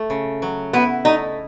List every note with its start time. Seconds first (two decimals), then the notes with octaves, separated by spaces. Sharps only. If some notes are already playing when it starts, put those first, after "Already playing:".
Already playing: A3
0.10 C#3
0.42 F#3
0.73 B3 E4
1.05 A3 D#4